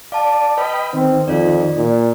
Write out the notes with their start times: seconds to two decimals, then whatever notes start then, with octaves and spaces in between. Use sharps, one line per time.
0.12 D5 F5 A5
0.57 B4 D#5 G5 B5
0.94 D#3 C4
1.28 F2 F4 D5
1.77 A#2